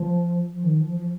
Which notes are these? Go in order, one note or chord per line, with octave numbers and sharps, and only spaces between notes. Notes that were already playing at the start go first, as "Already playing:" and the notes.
Already playing: F3
F3
D#3
F3
F3